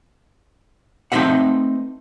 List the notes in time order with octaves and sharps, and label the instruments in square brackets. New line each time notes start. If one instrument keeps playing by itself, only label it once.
[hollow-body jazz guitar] A3 C4 D#4 B4 E5 F#5